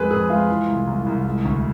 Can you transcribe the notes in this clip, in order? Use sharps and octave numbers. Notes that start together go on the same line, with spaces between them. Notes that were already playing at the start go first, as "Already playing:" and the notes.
Already playing: F2 G#3 G#4 B4
F2 G#4
G#3 F4
E3
C2
C2
C2
G#3
D2